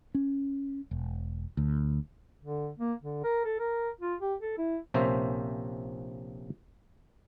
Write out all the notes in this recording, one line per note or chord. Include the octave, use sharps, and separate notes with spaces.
C#4
E1
D2
D3
A#3
D3
A#4
A4
A#4
F4
G4
A4
E4
A#1 C3 A#3 C#4 C5 E5